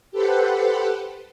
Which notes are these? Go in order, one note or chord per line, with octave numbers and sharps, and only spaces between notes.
G4 A4 B4 C5 F#5